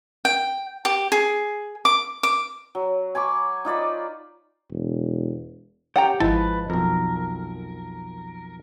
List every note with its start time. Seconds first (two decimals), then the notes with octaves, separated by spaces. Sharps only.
0.25 G5
0.85 G4
1.12 G#4
1.85 D6
2.23 D6
2.75 F#3
3.15 G#5 B5 C#6 D6
3.65 D#4 F4 D5 B5
4.71 E1
5.96 C#4 G4 F#5 G5 A#5
6.20 G#1 G#2 F3 G#3 E4 B4 A5
6.70 B1 F2 A#4